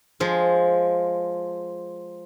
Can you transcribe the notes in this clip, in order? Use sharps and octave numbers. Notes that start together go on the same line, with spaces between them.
F3 G#3